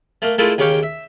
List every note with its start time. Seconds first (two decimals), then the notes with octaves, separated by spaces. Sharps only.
0.22 A3 A#3 A#4
0.38 G#3 A3 E4 F4 A4 A#4
0.58 D#2 C#3 G4 C#5 F5 G5
0.83 E5